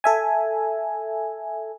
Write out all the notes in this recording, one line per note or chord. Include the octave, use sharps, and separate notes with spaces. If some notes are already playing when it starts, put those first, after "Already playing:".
A4 E5 G#5